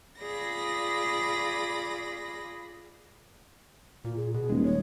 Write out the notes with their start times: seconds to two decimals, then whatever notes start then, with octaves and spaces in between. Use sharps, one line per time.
0.20 F4 G#4 D5 B5 A#6
4.05 A#2 F4
4.16 G#4
4.34 B2 G#4
4.49 D#1 G#3
4.64 G#3 C#5